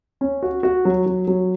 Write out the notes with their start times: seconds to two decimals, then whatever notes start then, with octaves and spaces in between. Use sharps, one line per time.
0.21 C#4
0.43 F#4
0.63 F#4
0.85 F#3
1.06 F#3
1.28 F#3